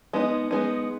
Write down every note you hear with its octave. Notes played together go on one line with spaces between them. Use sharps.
G#3 B3 D#4
G#3 B3 D#4